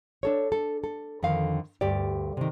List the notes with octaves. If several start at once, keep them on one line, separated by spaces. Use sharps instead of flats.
D4 A4 C#5
A4
A4
F2 D3 D#3 F5
D2 G2 G4 D5
C3 D#3